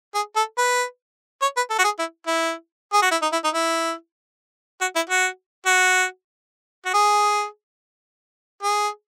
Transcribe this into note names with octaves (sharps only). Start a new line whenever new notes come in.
G#4
A4
B4
C#5
B4
A4
F#4
G#4
E4
E4
G#4
F#4
E4
D#4
E4
D#4
E4
F#4
E4
F#4
F#4
F#4
G#4
G#4